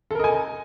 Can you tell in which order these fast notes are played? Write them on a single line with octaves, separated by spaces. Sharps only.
A4 A#4 D#5 G#5